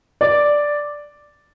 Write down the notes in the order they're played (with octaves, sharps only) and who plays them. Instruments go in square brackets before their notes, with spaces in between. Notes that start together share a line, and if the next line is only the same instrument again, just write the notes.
[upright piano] D5